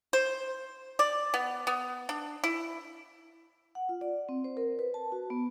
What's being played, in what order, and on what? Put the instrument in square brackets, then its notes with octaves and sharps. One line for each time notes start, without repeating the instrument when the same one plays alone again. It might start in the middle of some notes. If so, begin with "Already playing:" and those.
[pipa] C5
D5
B3
B3
D4
E4
[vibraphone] F#5
F4
D5
C4
C5
A#4
B4
A5
F#4
B3